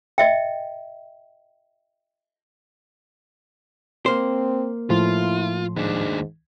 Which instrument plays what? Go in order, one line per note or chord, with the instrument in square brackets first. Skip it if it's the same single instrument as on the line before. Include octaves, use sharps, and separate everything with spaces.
[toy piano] D#5 E5 G5
[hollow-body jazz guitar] A#3 C5 [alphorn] C4
[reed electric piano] A2 F3 C6 [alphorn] E4 [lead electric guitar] F4
[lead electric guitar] D#2 D4 [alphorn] G#2